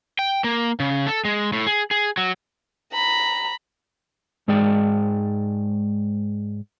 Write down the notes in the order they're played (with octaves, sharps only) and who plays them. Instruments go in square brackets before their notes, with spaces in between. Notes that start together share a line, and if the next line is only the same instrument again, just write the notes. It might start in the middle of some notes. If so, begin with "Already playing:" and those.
[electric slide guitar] G5
A#3
C#3
A4
G#3
A2
G#4
G#4
F#3
[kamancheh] A#5 B5
[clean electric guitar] G#2 G#3 G#4 D5 G5